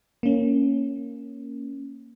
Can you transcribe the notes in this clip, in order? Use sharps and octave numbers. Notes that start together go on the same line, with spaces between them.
A#3 C#4